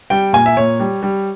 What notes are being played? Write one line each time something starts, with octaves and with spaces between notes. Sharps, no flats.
G3 G5
A#2 G#5
E5
A#2 C#5
G3
G3